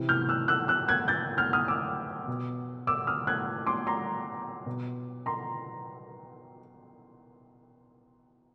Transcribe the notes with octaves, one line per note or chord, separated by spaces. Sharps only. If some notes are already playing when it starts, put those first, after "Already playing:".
Already playing: C3 E3
F6 G6
E6 F#6
E6 F#6
E6 F#6
F#6 G#6
G6 A6
F6 G6
D#6 F6
D6 E6
B2
D6 E6
D#6 F6
F#6 G#6
C6 D6
A#5 C6
B2
A#5 C6